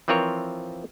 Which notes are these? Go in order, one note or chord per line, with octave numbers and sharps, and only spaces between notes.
E3 F3 C4 F4 A#4 C#5